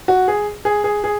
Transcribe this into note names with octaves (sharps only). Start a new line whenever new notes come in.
F#4
G#4
G#4
G#4
G#4